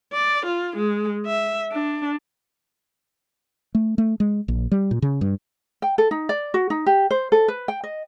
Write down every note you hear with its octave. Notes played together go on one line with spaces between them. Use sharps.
D5
F4
G#3
E5
D4
A3
A3
G#3
A#1
G3
A#2
C#3
G2
G5
A4
D#4
D5
F#4
D#4
G4
C5
A4
B4
G5
D#5